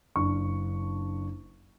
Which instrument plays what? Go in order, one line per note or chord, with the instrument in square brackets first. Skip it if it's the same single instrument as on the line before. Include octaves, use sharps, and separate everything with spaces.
[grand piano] F#1 D4 C#6